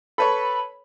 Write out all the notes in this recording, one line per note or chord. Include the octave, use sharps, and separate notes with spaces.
A4 B4 C#5 B5